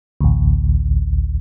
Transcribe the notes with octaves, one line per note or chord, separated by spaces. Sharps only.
A1 D2